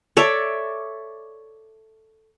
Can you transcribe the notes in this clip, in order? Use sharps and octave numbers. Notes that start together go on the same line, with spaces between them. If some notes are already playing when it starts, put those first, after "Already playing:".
A4 C#5 D5 E5